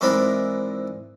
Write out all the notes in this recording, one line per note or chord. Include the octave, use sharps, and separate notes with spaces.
G#2 E3 C4 D4 A#4 B5